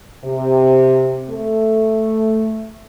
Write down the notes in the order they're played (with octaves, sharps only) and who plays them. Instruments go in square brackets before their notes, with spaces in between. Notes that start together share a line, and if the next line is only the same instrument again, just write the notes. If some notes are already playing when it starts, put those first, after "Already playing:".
[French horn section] C3
A3